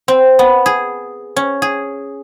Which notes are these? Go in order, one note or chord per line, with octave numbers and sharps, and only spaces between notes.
C4
B3
G#4
C#4
G#4